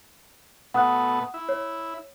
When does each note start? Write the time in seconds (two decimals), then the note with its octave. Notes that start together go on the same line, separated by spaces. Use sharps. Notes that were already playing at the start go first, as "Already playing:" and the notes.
0.74 B2 A3 B3 F#5 D#6 F#6
1.34 E4
1.49 C#5